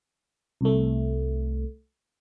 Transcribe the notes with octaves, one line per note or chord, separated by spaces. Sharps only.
C2 A3